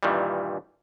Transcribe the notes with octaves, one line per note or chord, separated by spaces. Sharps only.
G2 A#2 D#3 E3 G3